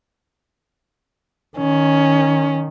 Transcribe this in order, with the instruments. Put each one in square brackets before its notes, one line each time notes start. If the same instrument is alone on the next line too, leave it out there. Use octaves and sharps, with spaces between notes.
[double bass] D#3 [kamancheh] C#4